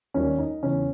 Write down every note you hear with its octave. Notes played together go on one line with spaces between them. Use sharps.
D#2 D#3 G3 C#4
D#4
E2 C#3 E3 C#4